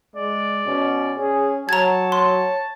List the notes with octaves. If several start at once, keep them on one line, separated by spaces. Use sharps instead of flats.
G#3 D5
B2 C#4
C#4 G#4
F#3 C#5 A5 A#5 G#6
C6